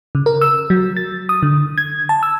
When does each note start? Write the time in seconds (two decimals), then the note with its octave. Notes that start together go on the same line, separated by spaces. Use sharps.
0.15 C#3
0.26 A#4
0.41 E6
0.70 F#3
0.97 A6
1.29 D#6
1.43 D3
1.78 G#6
2.09 A5
2.23 E6